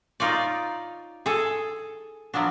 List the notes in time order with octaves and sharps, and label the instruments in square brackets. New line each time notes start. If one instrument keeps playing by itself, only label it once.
[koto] D#4 F4 C#5 D5
G#4 A4
F3 F#3 B3 D4